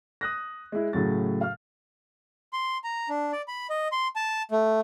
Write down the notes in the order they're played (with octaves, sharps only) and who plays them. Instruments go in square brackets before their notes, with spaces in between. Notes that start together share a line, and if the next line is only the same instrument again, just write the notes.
[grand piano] D#6 F#6 A#6
G#3 E4
A2 C#3 F#3 A6
F5 F6
[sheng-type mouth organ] C6
A#5
D4
D5
B5
D#5
C6
A5
A3